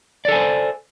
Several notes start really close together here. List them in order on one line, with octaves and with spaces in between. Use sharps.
D5 A4 G#5 C5